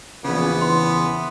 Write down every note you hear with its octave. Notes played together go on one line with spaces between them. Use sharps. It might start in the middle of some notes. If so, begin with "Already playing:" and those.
A#1 E2 C#3 B3
E3 C6